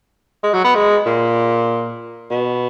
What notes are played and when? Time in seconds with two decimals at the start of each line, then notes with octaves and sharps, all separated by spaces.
0.44 G#3
0.54 F#3
0.64 B3
0.75 G#3
1.06 A#2
2.31 B2